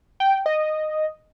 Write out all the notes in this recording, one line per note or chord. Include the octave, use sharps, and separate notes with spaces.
G5
D#5